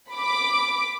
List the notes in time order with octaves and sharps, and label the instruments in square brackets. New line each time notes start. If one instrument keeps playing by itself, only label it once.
[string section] B5 D6